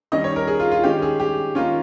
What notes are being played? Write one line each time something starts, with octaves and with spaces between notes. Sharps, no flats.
D#3 G3 C#4 D#5
C#5
A#4
G#4
F4
F4
D#3 G#3 C#4 G4
G#4
G4
D#3 A#3 C#4 F4